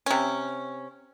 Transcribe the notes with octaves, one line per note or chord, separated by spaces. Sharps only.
C3 C#4